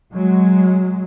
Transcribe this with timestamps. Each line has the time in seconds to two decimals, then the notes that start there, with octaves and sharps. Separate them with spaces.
0.14 F#3 G#3